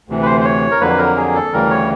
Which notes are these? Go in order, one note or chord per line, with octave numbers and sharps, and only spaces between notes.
D2 C3 E3
B4
C5
C5
C#5
A#4
F2 D3 F#3 A#3 B4
A#4
G#4
A4
D2 C#3 E3 G3 A#4
C#5